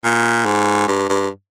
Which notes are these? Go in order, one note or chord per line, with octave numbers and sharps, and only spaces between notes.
A#2
G#2
G2
G2